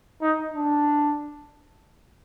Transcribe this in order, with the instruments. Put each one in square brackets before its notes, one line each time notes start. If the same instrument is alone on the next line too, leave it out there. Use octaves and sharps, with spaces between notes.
[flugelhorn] D#4
D4